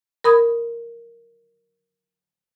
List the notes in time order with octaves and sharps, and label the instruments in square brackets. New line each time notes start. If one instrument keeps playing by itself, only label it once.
[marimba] A#4 B5 D#6 G#6